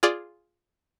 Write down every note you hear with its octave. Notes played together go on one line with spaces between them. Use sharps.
F4 G#4 D5